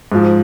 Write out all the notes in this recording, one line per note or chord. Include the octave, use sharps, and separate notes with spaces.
G#2 F3